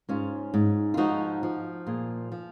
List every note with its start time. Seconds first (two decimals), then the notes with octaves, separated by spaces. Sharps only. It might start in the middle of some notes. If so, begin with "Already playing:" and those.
0.09 G#2 C#4 F4
0.54 G#2
0.94 F4
0.97 F3 D#4 F#4
1.43 F3
1.86 A#2 F4 G#4
2.32 F3